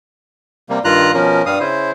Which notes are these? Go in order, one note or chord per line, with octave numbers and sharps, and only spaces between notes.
C3 G3 A#3
G2 D#3 F4 A#5 F#6
B2 F3 C#4 A#4
G2 G3 F5 D#6
C#3 E4 C5